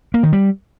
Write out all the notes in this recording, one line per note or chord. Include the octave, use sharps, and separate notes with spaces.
A#3
D#3
G3